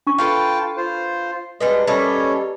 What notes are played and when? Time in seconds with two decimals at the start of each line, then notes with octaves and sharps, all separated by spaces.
0.07 D4 C#6
0.18 F4 A4 B4 F5 G5 A5
0.77 F4 C5
1.61 G3 G#3 D4 B4 D#5
1.87 G3 A#3 C#4 A4 C#5 D#5